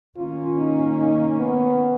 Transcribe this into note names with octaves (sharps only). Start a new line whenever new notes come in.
D#3 A#3 C#4 F4
D#4
D#4
B3